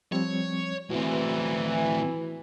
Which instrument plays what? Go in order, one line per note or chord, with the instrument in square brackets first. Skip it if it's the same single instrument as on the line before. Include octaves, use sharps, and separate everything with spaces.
[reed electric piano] F3 G3 C4 [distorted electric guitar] C#5
[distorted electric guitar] A2 C4 [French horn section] E3 [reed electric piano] F#4